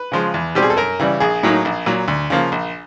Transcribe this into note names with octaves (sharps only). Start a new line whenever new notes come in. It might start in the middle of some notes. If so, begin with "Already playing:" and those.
Already playing: B4
C#3 F3 G#3
E2
B2 G3 C4 G4
G#4
A4
F#2 A#4
C#3 E3 G3
A#1 G#4
A2 F#3 A#3 D#4
A#1
A#2 F#3
D2
C#3 F3 A#3
A#1